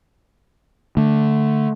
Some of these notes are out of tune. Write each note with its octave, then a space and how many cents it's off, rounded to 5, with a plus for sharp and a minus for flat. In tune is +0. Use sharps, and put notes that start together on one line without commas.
D3 +0 A3 +0